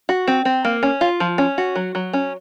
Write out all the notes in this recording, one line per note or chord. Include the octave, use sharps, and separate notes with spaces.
F#4
C4
C4
A#3
C#4
F4
F3
C#4
F#4
F#3
F#3
C#4